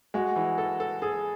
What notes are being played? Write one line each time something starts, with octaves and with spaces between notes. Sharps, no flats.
G#3 F#4
E3
A4
A4
G#4 A4